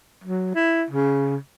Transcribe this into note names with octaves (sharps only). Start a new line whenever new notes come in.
F#3
E4
C#3